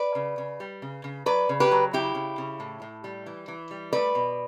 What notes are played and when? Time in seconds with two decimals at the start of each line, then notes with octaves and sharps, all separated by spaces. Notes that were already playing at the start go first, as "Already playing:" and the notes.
Already playing: B4 D5
0.15 C#3
0.38 C#3
0.60 G3
0.82 C#3
1.04 C#3
1.26 F#3 B4 D5
1.49 C#3
1.60 G4 B4
1.71 F#3
1.93 C#3 E4 G4
2.15 C#3
2.38 C#3
2.60 A2
2.82 A2
3.04 G3
3.26 E3
3.48 E3
3.71 G3
3.93 A3 B4 D5
4.15 B2